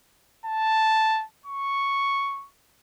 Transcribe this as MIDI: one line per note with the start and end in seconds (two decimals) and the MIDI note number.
0.46 1.24 81
1.46 2.47 85